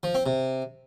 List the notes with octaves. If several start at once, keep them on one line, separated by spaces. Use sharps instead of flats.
F3
C4
C3